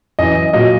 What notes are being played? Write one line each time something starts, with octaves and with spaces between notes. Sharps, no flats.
F#2 E3 D#5
A#2 F#3 D#5